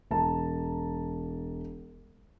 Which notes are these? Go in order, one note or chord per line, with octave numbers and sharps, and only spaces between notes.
E1 A5 A#5